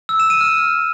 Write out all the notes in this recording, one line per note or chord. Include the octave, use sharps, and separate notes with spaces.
E6
E7
D#7
F6